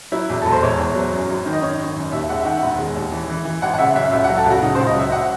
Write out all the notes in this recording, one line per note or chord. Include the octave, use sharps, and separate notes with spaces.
F#3 E4
E2
E1 A4
C5
E2 C#5
E2
F#3
F#2
G#1
D#3
D#5
D#3 C#5
G#1
F#2
D#2 E5
G#3 F#5
E5
D#3 F#5
E1
G#3
D#2
E3
E3
E3
G#1 F#5
F#5
C#3 E5
F#2 E5
C#2 E5
F#5
F#3
A4
C#2 F#4
C#3 D#4
C5
C#2
D#5
F#3 E5
F#5